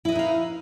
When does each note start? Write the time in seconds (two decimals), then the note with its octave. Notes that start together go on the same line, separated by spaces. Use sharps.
0.05 E4
0.09 D#5
0.12 B4
0.15 D#4
0.19 F5